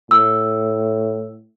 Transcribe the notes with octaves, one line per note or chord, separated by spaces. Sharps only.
A2 E6